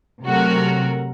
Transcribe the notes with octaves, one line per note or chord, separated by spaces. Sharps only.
C3 F#3 A3 F#4 A#4